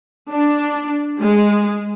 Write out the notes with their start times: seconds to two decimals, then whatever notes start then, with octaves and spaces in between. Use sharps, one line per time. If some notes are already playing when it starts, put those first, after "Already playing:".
0.31 D4
1.20 G#3